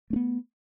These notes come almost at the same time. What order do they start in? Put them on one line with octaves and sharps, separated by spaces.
A3 C#4 B3